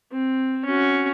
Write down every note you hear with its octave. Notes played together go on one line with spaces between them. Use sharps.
C4
C#4 F#4